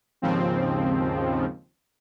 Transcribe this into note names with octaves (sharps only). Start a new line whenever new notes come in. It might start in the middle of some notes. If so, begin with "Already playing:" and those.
D#2 G#2 C#3 F3 C4